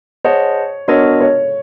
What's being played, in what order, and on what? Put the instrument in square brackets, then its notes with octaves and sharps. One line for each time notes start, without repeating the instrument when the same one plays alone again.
[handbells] G#4 C5 D#5 F#5 A5 [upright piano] C#5
[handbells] B3 D4 F#4 A#4 D#5 [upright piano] C#5
[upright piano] C#5